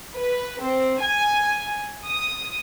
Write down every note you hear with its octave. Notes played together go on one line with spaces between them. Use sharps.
B4
C4
G#5
D#6